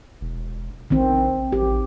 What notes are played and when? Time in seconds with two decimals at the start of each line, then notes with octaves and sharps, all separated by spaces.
0.21 E1
0.90 A#1 D#3 C4
1.52 A1 G4